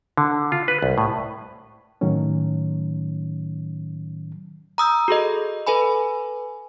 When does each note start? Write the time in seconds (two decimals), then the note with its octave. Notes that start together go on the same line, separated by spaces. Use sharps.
0.17 D3
0.52 F4
0.68 B4
0.82 C2
0.98 A2
2.01 A2 D#3 F#3 C#4
4.78 A#5 D#6 E6 G6
5.08 F#4 G#4 A4 D#5
5.67 A4 B4 G#5 B5